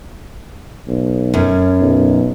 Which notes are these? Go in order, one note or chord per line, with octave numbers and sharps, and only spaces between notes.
B1
F#2 C#4
B1